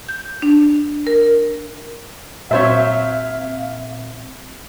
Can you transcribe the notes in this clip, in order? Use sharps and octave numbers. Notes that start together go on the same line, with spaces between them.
G6
D4
A#4
A#2 F#3 C4 C5 C#5 E5 F5